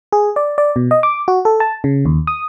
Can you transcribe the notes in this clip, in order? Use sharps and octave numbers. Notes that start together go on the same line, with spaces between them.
G#4
D5
D5
B2
D#5
D6
F#4
A4
A5
C#3
D#2
D#6